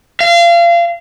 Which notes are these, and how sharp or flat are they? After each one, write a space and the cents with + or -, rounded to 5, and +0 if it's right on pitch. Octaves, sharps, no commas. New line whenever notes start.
F5 -30